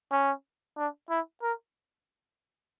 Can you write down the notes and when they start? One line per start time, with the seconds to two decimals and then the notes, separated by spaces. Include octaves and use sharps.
0.11 C#4
0.77 D4
1.10 E4
1.42 A#4